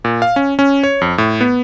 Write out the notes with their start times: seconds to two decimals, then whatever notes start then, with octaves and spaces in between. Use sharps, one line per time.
0.04 A#2
0.22 F5
0.36 C#4
0.59 C#4
0.84 C#5
1.01 F2
1.18 A2
1.41 B3